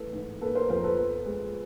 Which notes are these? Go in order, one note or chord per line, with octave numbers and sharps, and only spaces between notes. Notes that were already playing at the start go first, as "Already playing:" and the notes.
Already playing: E3 A3 A4 B4
G#2
A#3 A4 B4
A#4 C5
F2 A#4 C5
A4 B4
B3
G#3